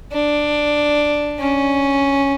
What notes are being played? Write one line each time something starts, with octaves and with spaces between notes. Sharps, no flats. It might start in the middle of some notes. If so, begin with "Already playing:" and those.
D4
C#4